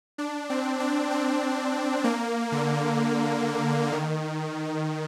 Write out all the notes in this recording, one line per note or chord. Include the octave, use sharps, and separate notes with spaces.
D4
C4
D4
C4
A#3
D3
D#3